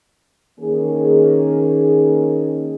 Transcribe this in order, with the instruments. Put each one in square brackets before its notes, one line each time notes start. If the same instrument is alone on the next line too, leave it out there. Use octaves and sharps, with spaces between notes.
[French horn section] D#3 A#3 C#4 G#4